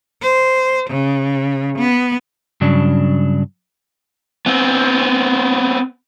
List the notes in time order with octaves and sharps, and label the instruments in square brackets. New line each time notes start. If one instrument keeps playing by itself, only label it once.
[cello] C5
C#3
B3
[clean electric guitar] G2 C#3 F#3 D4
[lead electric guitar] B3 C4